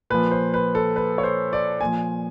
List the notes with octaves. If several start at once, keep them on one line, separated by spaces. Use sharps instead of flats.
A#2 F3 B4
C5
B4
A4
B4
C#5
C5
D5
A#2 F3 G#5